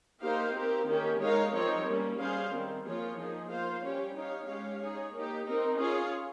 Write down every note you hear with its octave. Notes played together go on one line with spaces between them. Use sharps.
A#3 D#4 G4 C5 F5
C4 G4 A#4
D#3 A#3 C#4 G4
G#3 D#4 A#4 C#5 F5
F3 C4 D#4 A#4 C#5
G3 A#3 C#4
G3 C#4 G#4 C5 F5
D#3 G3 C4
F3 A#3 F4 G#4 C#5
F3 A#3 D#4 G#4
A#3 F4 C5 F5
G3 C#4 G4 C#5
D#4 G4 C#5 F5
G#3 C#4 G4 C#5 F5
D#4 G#4 C#5
A#3 D#4 G4
C4 D#4 A#4
C#4 F4 G#4 C#5 F5